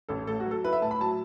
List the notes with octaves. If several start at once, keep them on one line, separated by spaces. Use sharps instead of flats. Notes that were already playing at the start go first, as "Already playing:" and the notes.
A1 A4
A2 A4
F#4
F#3
A4
E4 B4
E5
A2 A5
B5
F#3 A5